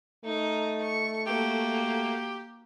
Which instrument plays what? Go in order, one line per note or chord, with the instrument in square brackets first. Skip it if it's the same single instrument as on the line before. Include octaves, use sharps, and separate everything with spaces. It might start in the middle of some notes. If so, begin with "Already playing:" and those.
[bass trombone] A3 [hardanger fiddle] D#4 A#4
[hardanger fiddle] C#6
[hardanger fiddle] A#3 F#4 [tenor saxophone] G4